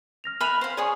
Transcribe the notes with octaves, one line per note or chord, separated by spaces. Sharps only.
F6 A#6 F7
E5 G#5 B5 F6 F#6 F7
C5 F5
G#4 C#5 D5 G#5 C#6 D#6